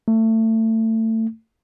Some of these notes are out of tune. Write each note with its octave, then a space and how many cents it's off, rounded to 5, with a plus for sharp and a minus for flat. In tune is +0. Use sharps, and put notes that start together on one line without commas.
A3 +25